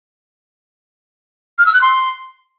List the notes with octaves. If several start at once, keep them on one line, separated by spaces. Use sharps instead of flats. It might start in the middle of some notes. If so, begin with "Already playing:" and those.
F6
E6
F#6
C6